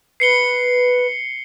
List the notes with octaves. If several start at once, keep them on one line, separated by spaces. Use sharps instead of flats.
B4 C7 C#7 G7